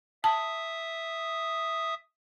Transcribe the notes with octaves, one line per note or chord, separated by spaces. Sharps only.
E5 A5 D#6